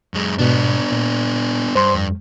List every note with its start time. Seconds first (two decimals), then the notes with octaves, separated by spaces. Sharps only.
0.14 F#2 G#3
0.39 G#2 B2 B3 D4
0.92 A#2
1.75 G2 C5 C6
1.95 F2